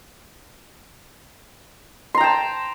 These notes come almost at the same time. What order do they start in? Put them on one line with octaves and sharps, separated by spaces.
C6 A#5 G5 A5